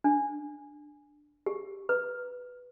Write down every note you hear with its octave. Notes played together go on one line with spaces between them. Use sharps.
D4
G4
B4